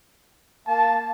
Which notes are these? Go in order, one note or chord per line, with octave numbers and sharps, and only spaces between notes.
A#3 A5